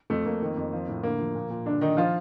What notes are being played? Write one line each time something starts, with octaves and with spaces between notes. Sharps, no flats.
F2 A3
F2 A#3
D#3
F2
F3
A2
D3 A#3
F3
A#2
A#2
G2 D3 D4
D#3 D#4
F3 F4